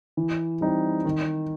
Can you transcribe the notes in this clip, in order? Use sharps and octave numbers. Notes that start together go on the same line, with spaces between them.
E3
G3 C4 D#4
D#3